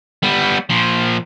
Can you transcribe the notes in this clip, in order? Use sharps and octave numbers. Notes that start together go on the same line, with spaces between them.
G3 B3
A#2 F3